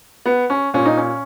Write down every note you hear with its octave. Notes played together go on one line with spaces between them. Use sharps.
B3
C#4
A#2 C#4
D#4
C#4